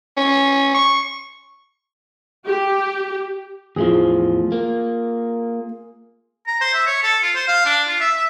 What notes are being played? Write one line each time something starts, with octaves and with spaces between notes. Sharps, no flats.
C#4
C#6
G4
E2 A2 F3 F4 G#4
A#3
A#5
C5
E5
C#5
A4
F4
C5
F5
D4
F4
E5
E5